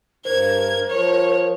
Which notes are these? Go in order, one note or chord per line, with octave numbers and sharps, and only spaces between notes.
G2 A#4 C5 G#6
F3 C#5